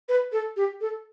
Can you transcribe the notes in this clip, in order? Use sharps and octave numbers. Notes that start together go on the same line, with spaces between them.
B4
A4
G4
A4